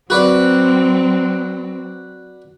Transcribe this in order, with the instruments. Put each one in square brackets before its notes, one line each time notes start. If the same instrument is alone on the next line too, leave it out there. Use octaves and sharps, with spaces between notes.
[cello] F#3 C4 [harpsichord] F#4 B4 D5